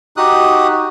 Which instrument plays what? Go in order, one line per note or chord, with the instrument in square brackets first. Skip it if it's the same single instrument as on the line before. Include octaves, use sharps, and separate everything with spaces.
[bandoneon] D#4 F#4 G4 D#6 F#6